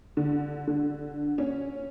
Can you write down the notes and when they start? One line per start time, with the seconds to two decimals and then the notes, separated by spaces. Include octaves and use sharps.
0.17 D3
0.67 D3
1.38 C#4